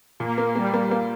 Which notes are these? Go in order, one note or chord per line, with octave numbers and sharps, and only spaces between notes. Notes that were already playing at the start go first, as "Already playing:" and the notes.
A#2 A#3
A#3
G3 A#3
A#3
A#3